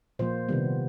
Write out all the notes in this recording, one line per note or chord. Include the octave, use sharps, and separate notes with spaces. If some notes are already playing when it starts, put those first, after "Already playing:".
A#2 F3 A#3 C5
C3 D#3 G3 B3